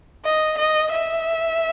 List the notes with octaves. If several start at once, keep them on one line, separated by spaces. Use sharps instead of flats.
D#5
D#5
E5